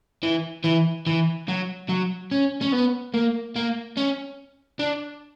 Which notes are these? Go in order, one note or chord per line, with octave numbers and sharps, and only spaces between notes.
E3
E3
E3
F#3
F#3
C#4
C#4
B3
A#3
A#3
C#4
D4